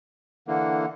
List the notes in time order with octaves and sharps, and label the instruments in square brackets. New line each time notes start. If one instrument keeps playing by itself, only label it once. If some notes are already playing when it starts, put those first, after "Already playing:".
[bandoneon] D3 E3 A#3 [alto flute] F#5